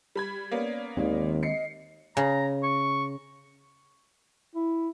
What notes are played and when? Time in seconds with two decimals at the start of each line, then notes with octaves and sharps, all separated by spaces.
0.16 G3 B5 G#6
0.52 A#3 B3 C#4 D5
0.97 D#2 D#3 G#3 C4 D5
1.43 D#5 C7 C#7
2.17 C#3 A#5
2.64 C#6
4.55 E4